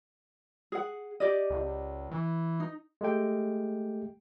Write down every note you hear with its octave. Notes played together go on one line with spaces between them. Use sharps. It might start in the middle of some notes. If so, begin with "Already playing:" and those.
G#4 F#5
G4 D5 D#5
C#2
E3
D#4
G#3 A3 G4 G5